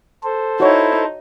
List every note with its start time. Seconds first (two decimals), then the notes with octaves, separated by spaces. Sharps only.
0.24 A4 C5
0.60 D#4 E4 F#4 C#5